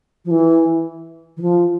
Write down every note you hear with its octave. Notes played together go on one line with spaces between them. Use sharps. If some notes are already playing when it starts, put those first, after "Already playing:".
F3
E3
E3
F3